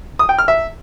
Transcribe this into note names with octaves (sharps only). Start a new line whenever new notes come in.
D#6
G5
F6
E5